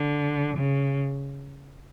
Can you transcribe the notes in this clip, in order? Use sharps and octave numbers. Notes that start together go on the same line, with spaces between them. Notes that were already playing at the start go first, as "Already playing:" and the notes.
Already playing: D3
C#3